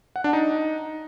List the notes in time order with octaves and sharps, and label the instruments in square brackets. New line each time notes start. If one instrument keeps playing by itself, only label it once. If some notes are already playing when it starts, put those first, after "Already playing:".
[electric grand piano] F#5
D4
D#4